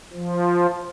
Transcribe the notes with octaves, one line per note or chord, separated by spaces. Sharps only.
F3